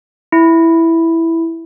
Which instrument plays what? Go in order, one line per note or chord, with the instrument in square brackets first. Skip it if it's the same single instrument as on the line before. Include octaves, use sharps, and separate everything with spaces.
[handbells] E4